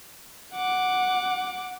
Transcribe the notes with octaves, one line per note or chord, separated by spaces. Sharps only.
F#5 D6